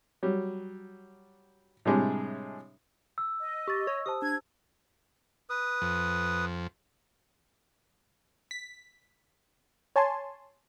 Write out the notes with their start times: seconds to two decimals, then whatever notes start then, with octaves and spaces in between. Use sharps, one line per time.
0.23 F#3 G3
1.85 A2 C3 G3 G#3 D4
3.18 E6
3.41 D#5
3.68 G4 C#6 A6
3.87 C#5 C#6
4.06 G4 C5 A5 D#6
4.22 D4 G#6
5.50 B4 D#6
5.82 F2
8.51 B6
9.96 C#5 G#5 A5 C6